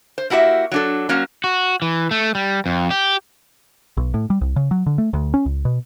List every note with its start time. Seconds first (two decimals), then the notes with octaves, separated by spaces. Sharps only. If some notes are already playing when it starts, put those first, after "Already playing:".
0.18 C5
0.30 A#3 E4 F#4 G4 E5
0.72 F#3 D4 A4
1.09 F#3 A#3 C#4
1.44 F#4
1.82 E3
2.11 A3
2.35 G3
2.66 F2
2.91 G4
3.97 B1
4.14 A2
4.30 G3
4.41 C2
4.56 C#3
4.71 F#3
4.86 D3
4.98 A3
5.13 D2
5.34 C#4
5.46 C#2
5.65 B2